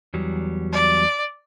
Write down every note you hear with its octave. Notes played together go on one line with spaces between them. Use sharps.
E2 F#3 G3
D5